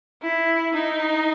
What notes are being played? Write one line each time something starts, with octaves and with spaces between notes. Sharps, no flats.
E4
D#4